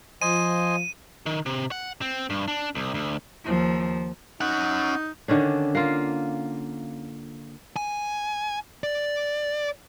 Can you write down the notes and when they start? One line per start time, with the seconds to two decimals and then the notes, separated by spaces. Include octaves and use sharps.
0.22 F3 C5 D#5 G#5 D#7
1.26 D#3
1.46 C3
1.71 F#5
2.01 C4
2.30 G2
2.48 D4
2.75 C2
2.94 D2
3.44 D#2 F3
4.41 C#4 D#4 F#5
5.28 D3 D#3 C#4 D4
5.75 A#3 F4
7.76 G#5
8.84 D5